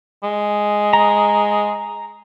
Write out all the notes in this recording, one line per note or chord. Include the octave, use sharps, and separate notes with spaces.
G#3
A#5